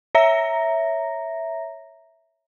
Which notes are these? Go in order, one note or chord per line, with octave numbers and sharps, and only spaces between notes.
C#5 E5 A#5 A#6